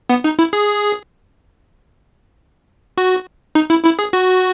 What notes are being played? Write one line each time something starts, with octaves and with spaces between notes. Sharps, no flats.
B3
D#4
E4
G#4
F#4
D#4
E4
E4
G#4
F#4